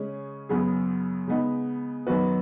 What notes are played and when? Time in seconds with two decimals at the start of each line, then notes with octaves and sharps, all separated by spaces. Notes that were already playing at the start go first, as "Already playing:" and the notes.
Already playing: C#3 G#3 C#4 G#4 C#5
0.49 F#2 C#3 B3 G#4
1.27 C#3 G#3 B3 D#4
2.07 F#2 D#3 B3 F#4 B4